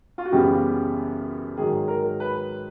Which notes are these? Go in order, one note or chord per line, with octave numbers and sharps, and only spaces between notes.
F4
F#4
F#2 C#3 E3 G3 B3 G4
G#2 D#3 F#3 G#4
A#4
B4